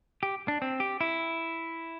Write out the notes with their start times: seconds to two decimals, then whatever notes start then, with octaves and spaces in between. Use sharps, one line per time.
0.23 G4
0.48 D4
0.62 C4
0.80 G4
1.01 E4